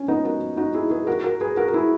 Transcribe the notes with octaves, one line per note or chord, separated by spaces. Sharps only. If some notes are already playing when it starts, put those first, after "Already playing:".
Already playing: C#4
B3 D#4
F#4 A#4
D#4 F#4
E4 G#4
G#4 B4
F#4 A#4
F#4 A#4
G#4 B4
F#4 A#4
A#4
E4 G#4